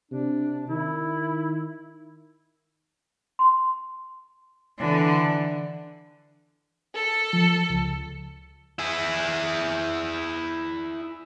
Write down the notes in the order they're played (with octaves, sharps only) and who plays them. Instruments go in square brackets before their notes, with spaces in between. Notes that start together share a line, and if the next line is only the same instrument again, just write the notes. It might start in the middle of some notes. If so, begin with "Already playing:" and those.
[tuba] C3 [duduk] D4
[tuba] D#3 [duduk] E4
[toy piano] C6
[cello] D3 E3
[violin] A4
[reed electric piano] F3
C#2
[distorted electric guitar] E4 G#4